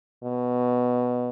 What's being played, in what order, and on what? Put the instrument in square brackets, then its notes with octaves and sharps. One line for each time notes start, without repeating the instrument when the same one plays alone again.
[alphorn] B2